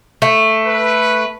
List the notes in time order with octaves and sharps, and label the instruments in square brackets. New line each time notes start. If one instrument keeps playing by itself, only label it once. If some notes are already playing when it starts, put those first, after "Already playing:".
[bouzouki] A3
[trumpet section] B4